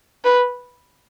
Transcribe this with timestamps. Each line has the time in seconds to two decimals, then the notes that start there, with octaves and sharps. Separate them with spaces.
0.25 B4